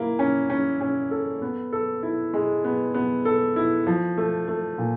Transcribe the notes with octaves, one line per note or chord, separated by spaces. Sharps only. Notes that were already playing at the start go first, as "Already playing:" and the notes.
Already playing: A#3 E4
C#4
C#4
C#4
A4
B3
A4
E4
G#3
B3
B3
A4
E4
F3
A3
A3
A#2